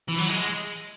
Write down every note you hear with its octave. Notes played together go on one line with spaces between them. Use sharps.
E3
F#3
G#3